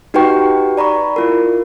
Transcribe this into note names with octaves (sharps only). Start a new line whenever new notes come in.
D#4 F#4 G4 B4 G5 C#6
D5 A#5 B5 C#6
E4 F4 A#4